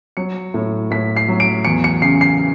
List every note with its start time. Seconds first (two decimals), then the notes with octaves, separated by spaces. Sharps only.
0.17 F#3 C#7
0.54 A2
0.91 A2 B6
1.16 C7
1.28 F#3
1.40 D7
1.65 E2 C#7
1.84 C#7
2.02 C#3 C7
2.21 C7